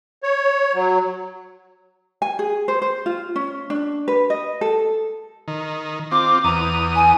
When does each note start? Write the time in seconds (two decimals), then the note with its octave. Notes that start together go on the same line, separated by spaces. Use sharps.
0.23 C#5
0.74 F#3
2.22 G#5
2.39 G#4
2.68 C5
2.82 C5
3.06 F4
3.36 C#4
3.70 D4
4.08 B4
4.30 D#5
4.61 A4
5.48 D#3
6.12 C4 F4 D6
6.44 E2 A#5 D#6
6.95 G#5